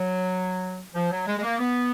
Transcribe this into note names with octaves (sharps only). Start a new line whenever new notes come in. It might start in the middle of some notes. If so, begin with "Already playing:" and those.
Already playing: F#3
F3
F#3
G#3
G#3
A#3
B3